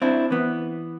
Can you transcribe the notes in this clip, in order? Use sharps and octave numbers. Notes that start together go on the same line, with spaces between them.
C4 D4 E4
E3 B3